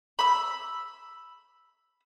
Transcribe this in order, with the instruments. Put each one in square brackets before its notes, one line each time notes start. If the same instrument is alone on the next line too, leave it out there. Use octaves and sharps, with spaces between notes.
[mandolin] B5 E6